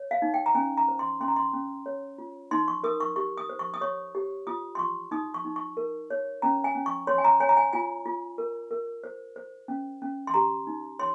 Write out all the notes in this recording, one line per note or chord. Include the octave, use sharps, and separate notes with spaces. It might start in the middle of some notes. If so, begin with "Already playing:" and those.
Already playing: C#5
F5
D#4
G5
A#5
C#4 G#5
A#5
C5
C6
C#4 C6
A#5
C6
C#4
C#5
F4
D#4 C6
C#6
A#4 D#6
C#6
G4 C#6
D#6
C5
C#6
D#6
C#5 C#6
G4
F4 D#6
C6
F4 C#6
D#4 D#6
C#6
D#4
C#6
A#4
C#5
C#4 A#5
G#5
C#4
C#6
C#5 C6
G#5
A#5
C#5 G#5
A#5
G#5
F4 G#5
F4
A#4
A#4
C5
C5
C#4
C#4
C6
G4 A#5
D#4
C#5 C6